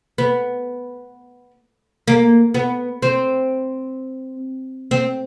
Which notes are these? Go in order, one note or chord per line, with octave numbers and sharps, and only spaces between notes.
B3
A#3
B3
C4
C4